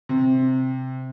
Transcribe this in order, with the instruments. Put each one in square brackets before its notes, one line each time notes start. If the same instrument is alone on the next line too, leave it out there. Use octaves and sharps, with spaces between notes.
[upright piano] C3